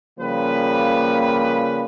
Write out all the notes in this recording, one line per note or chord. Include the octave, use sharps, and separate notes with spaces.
C#3 F3 G3 A#3 B4